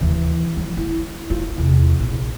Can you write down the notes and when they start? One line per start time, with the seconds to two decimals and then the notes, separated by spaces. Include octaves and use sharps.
0.01 D#2 E3
0.56 F3 F#3
0.77 E4
1.30 F4
1.58 E2 C3
1.99 A#1